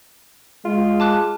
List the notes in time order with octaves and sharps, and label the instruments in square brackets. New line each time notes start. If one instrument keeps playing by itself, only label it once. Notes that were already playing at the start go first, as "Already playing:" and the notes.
[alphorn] G#3 [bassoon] F4
[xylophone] A5 D6 F#6